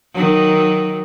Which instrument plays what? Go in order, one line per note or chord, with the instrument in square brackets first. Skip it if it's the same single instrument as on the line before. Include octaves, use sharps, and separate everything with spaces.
[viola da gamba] D#3 F#3